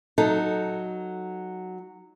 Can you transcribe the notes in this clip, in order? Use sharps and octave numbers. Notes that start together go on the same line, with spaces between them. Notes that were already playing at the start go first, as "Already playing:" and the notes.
F#3 D#4 A4